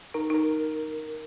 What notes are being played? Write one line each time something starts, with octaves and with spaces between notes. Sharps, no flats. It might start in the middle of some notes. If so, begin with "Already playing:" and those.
D#4 A#4
D#4 A#4